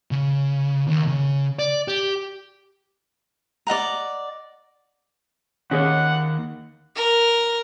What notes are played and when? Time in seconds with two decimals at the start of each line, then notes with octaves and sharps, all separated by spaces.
0.11 C#3
0.87 D#2
1.08 C#3
1.59 D5
1.88 G4
3.67 D5 D#5 F#5 A#5
5.71 D#2 C#4 G#4 C#5 F#5
6.96 A#4